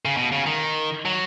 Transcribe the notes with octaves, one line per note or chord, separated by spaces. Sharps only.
C#3
B2
C#3
D#3
F#3